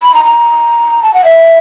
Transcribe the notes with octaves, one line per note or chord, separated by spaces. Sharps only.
B5
A#5
A#5
A5
F#5
E5